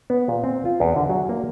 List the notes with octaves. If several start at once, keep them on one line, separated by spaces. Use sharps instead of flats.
B3
A#2
C4
F4
E2
D3
F#3
A#3